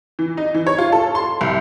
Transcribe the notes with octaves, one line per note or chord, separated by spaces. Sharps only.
E3
D#4
E3
C#5
F4
A4
C6
C2